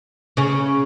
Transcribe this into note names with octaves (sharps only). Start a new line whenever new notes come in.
C#3 C#4